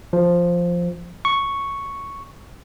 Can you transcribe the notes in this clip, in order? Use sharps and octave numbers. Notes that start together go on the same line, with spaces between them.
F3
C#6